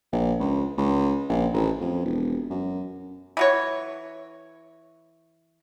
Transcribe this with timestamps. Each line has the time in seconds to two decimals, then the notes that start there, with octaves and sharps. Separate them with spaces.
0.12 A#1
0.40 C#2
0.77 C#2
1.29 A#1
1.53 A1
1.81 F2
2.05 E1
2.50 F#2
3.37 E3 F#4 C#5